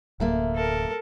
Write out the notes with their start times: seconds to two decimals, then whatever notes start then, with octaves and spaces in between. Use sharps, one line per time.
0.20 D1 F#2 A3 A#3
0.55 A4 A#4